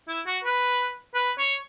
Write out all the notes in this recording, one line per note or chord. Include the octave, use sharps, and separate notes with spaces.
E4
F#4
B4
B4
C#5